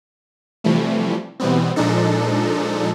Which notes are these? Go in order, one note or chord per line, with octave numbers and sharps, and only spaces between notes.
C3 E3 F3 G3 A3
B2 E3 G3 B3 C4
A#2 F3 G#3 D4 D#4 A4